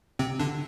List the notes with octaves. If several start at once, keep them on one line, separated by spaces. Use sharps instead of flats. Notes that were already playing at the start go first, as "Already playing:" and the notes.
C3 C4
D3 D4